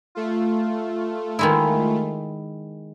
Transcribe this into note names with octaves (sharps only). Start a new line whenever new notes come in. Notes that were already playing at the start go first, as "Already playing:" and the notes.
A3 F4
D#3 G#3 E4